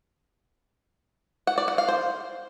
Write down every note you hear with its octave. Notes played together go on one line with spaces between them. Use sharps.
F#5
D5
F#5
F5
C5